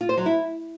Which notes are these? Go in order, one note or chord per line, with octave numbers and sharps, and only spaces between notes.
F4
C5
F#3
E4